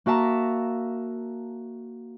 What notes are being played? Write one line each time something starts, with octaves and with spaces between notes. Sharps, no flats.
A#3 F#4 E5 A5 A#5